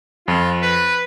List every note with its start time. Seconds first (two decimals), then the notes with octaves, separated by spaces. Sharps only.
0.28 F2 F4
0.62 B4